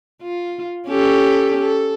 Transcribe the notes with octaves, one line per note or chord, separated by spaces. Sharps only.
F4
C#4 G4 A4
A4